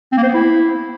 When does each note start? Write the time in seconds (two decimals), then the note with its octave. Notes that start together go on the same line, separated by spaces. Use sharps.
0.12 C4
0.18 A#3
0.23 C5
0.29 B3
0.34 E4